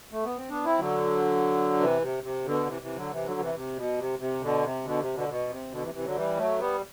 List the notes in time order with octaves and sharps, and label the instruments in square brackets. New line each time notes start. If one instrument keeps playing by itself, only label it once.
[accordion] A3
B3
C4
B3 D4
C4 E4
D3 F#3
C3 E3
C3
C3
B2 D3
C3 E3
C3 E3
D3 F#3
C3 E3
D3 F#3
C3 E3
C3
B2
C3
C3
B2 D3
C3
B2 D3
C3
B2 D3
B2
C3
B2 D3
C3 E3
C3 E3
D3 F#3
E3 G3
F#3 A3
G3 B3